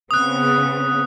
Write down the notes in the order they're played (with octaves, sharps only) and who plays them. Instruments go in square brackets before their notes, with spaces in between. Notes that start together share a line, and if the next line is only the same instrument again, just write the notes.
[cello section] C#3 B3 C4 [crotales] D#6 F#6